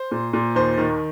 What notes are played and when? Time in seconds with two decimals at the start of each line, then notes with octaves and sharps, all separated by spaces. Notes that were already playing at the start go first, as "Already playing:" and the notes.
Already playing: C5
0.11 A#2
0.33 A#2
0.55 D#2 C5
0.78 D#3